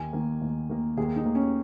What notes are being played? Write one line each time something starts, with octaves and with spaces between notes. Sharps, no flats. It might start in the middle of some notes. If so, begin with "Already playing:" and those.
Already playing: D#2 G#5
D#3 A#3
D#2
D#3 A#3
D#2 G#4
D#4
D#3 A#3
C#4